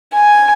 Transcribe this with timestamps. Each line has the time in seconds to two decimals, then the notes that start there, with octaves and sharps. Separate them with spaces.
0.15 G#5